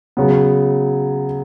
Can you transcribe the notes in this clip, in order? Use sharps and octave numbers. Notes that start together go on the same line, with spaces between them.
C#3 F#3 B3